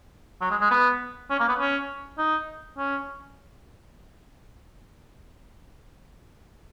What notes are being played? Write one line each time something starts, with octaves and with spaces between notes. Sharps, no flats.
F#3
G#3
G#3
B3
C#4
A#3
B3
C#4
D#4
C#4